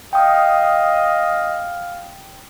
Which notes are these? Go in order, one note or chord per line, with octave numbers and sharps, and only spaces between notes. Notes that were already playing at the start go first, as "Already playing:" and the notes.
D#5 F5 G5 D#6